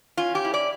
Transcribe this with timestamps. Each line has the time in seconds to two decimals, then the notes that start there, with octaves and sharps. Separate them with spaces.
0.17 C#4 F4
0.35 G4
0.45 E4
0.54 D5